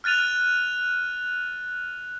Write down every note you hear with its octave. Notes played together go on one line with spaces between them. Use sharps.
F6 F#6 A6 D#7 F7